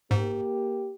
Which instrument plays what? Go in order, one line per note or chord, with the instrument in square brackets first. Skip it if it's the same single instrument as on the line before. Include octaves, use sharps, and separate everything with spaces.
[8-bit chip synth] G#2 [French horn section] A#3 G4